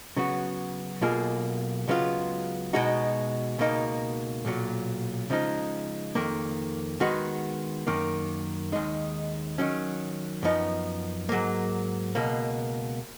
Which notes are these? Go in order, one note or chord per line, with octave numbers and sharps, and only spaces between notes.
C#3 F#3 B3 F#4
B1 B2 A#3 F4 G#4
C#2 C#3 F#3 B3 F4
B2 G#3 D#4 F#4
C#2 B2 A#3 D#4
B1 A#2 F#3
C#3 F3 G#3 D#4
F2 D#3 A#3
D#3 G#3 B3 F#4
F#2 D#3 A#3
D#2 D#3 G#3 D#4
D#3 F#3 C#4
F#2 F3 B3 D#4
G#2 F#3 A#3
C#2 B2 A#3